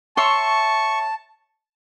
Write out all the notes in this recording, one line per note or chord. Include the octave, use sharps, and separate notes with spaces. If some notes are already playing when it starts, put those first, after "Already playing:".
C#5 E5 A5 C6 C#6